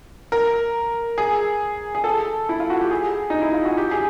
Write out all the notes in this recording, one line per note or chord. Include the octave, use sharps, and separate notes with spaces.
A#4
G#4
G#4
A4
E4
F4
F#4
G4
G#4
D#4
E4
F4
F#4
G4
G#4